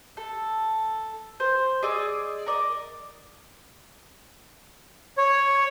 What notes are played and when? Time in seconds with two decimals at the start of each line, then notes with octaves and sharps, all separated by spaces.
0.17 A4
1.40 C5
1.83 G#4 D5 D#5 E6
2.46 A#4 D5 D#5
5.18 C#5